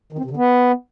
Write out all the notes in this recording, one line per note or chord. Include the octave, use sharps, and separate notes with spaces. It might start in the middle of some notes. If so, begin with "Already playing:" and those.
D#3
C4
C3
D3
B3